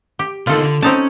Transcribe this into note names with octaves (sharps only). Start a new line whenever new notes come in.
G4
D3 A#3 D#4 F4 A4
D3
C4 C#4 D#4 A5